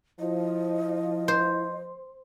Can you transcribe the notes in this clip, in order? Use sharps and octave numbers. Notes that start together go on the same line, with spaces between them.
F3 E4 D#5
C5